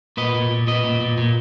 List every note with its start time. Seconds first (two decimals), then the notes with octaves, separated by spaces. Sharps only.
0.17 A#2 B4 D#5
0.35 A#2
0.51 A#2
0.67 A#2 B4 D#5
0.84 A#2
1.01 A#2
1.18 A#2